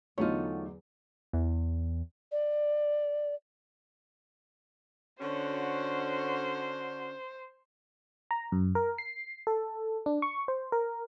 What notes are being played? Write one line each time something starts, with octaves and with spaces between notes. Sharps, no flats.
E2 D3 F#3 A3 D#4 F4 A4 C#5
E2
D5
D3 C#4 F#4 C5
A#5
F#2
A#4
C7
A4
D4
C#6
C5
A#4